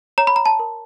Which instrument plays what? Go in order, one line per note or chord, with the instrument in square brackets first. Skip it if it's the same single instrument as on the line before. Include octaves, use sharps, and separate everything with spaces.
[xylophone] C#5 A#5
B5
A#5
A5
A#4